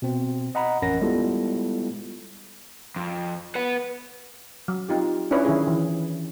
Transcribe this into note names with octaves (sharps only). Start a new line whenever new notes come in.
B2 C4
D#5 F#5 A#5 B5
A1 F2 C#4 A#4 F#5 A#6
G3 G#3 B3 E4 F4 A4
F2
B4 F#5
F#3
C4 D#4 F4 G4
C#4 D4 E4 B4 C#5
D#3 F#3 C#4 E4 G#4 C#5
E3